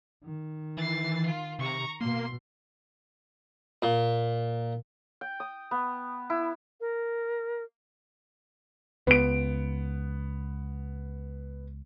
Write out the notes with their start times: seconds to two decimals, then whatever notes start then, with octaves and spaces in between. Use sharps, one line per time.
0.24 D#3
0.77 E3 A6 C7
1.26 F4
1.59 C3 A#5 C#6
2.01 B2 A#3 C6
3.82 A#2
5.21 G5
5.40 D#6
5.71 B3
6.30 E4
6.81 A#4
9.07 C#2 B3 D7